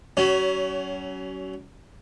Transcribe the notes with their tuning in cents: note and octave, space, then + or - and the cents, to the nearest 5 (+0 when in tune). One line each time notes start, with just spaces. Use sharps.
F#3 +35 C#4 +15